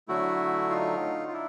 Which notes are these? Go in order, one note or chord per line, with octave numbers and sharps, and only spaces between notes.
D3 F#3 A3 E4 F#4
D#4 F4
F4
D4 E4